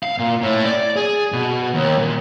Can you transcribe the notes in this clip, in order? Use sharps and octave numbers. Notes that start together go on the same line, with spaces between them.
F5
A#2
A2
D5
G#4
B2
D#2
A#2